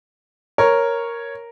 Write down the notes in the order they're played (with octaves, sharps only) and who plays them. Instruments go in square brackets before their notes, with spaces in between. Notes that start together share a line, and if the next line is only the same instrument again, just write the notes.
[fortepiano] A#4 [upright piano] C#5